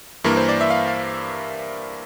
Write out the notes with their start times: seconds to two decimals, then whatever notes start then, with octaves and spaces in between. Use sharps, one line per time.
0.24 G2 E3 A#3 A#4
0.37 C5
0.49 D5
0.61 E5
0.70 F5
0.88 F5